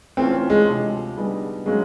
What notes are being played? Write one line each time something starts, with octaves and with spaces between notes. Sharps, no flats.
E3 A3 C4 C#4 F4
G#3
D2 C3 F3
D3 G3 B3 D#4 G#4
D3 F#3 G#3 A#3 C#4